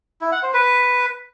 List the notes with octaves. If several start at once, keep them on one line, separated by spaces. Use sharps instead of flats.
E4
F#5
C5
B4